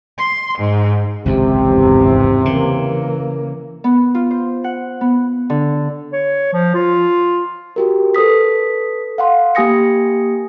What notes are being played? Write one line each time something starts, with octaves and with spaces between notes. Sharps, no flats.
C6
G#2
G#1 C#2 F#2 C3
E2 G#2
C#3 E3 A#3
B3
F4
C5
F#5
B3
D3
C#5
F3
F4
F#4 G4 A#4
A4 B4 D#6 B6
F5 F#5 C6
A#3 G4 G#5 D#6 A#6 C#7